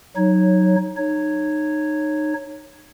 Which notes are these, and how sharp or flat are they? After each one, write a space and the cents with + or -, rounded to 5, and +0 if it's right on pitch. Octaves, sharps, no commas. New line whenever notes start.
F#3 +0 D#4 +0 C#5 -10
D#4 -25 C#5 -5